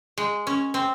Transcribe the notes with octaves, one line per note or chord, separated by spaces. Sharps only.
G#3
C#4
C4